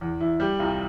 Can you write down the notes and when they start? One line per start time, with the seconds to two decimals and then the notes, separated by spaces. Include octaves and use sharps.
0.01 E2
0.21 E2 E4
0.40 G3 G4
0.59 C2 F4